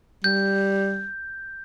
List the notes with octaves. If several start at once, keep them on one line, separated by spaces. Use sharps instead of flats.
G3 G6